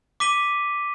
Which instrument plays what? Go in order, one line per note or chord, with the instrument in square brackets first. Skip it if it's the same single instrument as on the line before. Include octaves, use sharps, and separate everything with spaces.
[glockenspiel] D6 B6 D#7 G7